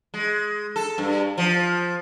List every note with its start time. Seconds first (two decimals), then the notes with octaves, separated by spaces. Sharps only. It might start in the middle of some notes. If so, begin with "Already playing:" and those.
0.14 G#3
0.76 A4
0.98 G2
1.38 F3